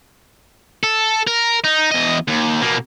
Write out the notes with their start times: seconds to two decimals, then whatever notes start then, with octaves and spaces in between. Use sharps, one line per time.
0.83 A4
1.27 A#4
1.64 D#4
1.92 E2 D#5
2.28 D#2
2.61 B2 A#3